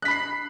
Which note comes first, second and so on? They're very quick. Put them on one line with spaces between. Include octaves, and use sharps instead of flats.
F#6 B6 B5 C7